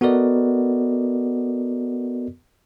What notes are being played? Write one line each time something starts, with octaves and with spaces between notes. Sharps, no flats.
B3 F#4 A4 A#4 D5 D#5